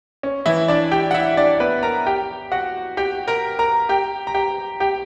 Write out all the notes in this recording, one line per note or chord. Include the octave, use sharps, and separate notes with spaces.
C#4
E3 E4
D4 D5
G4 G5
F#5
E4 E5
D4 D5
B3 B4
A#4 A#5
G4 G5
F#4 F#5
G4 G5
A#4 A#5
A#4 A#5
G4 G5
A#5
G4 G5
G4 G5